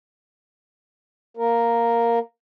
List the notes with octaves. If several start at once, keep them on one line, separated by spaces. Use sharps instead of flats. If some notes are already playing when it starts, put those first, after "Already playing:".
A#3 A#4